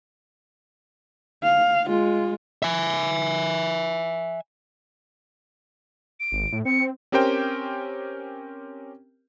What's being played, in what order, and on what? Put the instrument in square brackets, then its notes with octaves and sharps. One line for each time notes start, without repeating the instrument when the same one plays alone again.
[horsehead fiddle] F5
G#3 F4
[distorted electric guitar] E5 G#5
[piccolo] D7
[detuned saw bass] G#1
A2
[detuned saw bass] C4 [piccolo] C#7
[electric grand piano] C4 C#4 G4 A#4 C5 G5